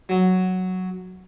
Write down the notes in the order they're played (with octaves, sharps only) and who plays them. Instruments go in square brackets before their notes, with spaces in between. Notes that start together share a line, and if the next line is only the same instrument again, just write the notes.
[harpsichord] F#3